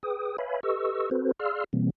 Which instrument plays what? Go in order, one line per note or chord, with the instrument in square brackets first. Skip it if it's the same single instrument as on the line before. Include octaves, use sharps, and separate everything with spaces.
[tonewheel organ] G#4 B4 G5 D#6
B4 C#5 E5 F5 G#5 B5
G4 A4 B4 D#5 C#6 E6
C4 F#4 A4 B4 C5
G#4 D5 F5 C6 E6 F6
B2 E3 G3 A#3 C4